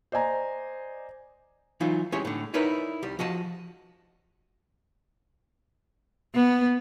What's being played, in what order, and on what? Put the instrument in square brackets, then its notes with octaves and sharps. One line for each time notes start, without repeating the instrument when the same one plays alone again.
[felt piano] C5 D5 D#5 G#5 A#5
[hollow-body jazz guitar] E3 F#3 D#4 F4
G#3 C#4 E4 G4 C#5
A2 D3
D#4 E4 A#4 B4 C#5 D5
C2 G3
F3 F#4 D#5 A5
[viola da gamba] B3